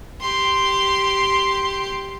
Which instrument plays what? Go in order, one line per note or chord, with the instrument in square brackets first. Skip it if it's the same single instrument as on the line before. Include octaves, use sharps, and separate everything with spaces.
[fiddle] G4 C6